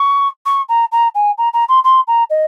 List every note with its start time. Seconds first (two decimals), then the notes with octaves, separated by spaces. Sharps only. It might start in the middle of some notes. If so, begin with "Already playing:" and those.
Already playing: C#6
0.46 C#6
0.69 A#5
0.92 A#5
1.15 G#5
1.38 A#5
1.54 A#5
1.69 C6
1.84 C6
2.07 A#5
2.30 D#5